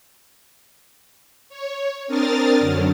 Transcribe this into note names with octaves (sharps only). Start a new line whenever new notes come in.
C#5
C4 D4 A#4 D#6 F6 A6
F#2 D3 F#3